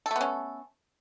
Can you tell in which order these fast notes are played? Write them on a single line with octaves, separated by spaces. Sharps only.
A4 A3 B3 C#4